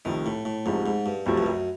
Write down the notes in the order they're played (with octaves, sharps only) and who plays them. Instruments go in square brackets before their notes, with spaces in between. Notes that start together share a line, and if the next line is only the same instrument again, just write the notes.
[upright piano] C2 C3 F3 A3 [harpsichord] D#3
[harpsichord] A2
A2
[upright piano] C2 C3 F3 A3 [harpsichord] G#2
[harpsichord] G#2
G2
[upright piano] C2 C3 F3 A3 [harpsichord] F#2
[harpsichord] G2
F#2